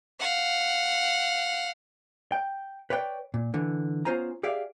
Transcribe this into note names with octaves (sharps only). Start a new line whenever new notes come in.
F5 F#5
G5
B4 C#5 D5 F#5 G5
A#2
D3 E3
B3 C#4 F4 C5 G#5 A#5
G4 G#4 D5 E5 F5